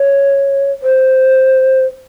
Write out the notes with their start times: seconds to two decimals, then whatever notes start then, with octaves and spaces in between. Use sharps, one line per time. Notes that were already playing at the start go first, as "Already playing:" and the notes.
Already playing: C#5
0.82 C5